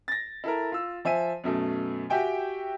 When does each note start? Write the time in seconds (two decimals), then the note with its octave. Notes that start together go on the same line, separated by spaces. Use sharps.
0.08 A6 A#6
0.44 E4 A4 A#4
0.72 F4 E6
1.05 F3 E5 G#5 D#7
1.44 F#2 B2 A3
2.10 F#4 G4 E5 G5 G#5